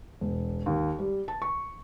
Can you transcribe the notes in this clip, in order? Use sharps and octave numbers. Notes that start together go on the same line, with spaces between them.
E1
D#2
G3
A5
C#6